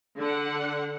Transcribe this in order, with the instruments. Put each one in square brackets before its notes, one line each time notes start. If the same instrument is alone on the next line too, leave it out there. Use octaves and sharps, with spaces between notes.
[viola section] D3 F#5